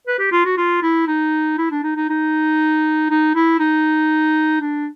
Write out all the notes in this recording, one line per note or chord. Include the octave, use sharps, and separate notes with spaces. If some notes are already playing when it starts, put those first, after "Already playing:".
B4
G4
F4
F#4
F4
E4
D#4
E4
D4
D#4
D#4
D#4
D#4
E4
D#4
D4